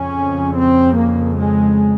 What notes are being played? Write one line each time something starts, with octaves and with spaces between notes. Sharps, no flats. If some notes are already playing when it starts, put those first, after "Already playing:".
Already playing: F2 C#3 C#4
C4
A#3
G#3